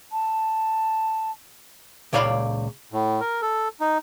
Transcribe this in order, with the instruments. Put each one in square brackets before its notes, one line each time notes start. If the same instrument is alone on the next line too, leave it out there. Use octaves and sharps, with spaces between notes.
[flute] A5
[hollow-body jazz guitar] C#2 A#2 C#5 D5 F5 B5
[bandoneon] A2
A#4
A4
D#4